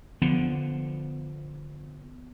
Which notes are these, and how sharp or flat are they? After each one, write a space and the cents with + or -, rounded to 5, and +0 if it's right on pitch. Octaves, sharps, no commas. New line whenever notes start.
D3 +0 F3 +0 B3 +5